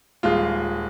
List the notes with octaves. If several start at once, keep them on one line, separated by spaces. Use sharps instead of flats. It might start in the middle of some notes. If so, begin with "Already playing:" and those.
D#1 G#3 F4